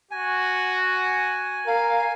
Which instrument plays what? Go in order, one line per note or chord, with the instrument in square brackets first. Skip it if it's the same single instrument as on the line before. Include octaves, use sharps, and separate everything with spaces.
[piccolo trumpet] F#4 [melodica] G#5
[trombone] A#4 [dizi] F5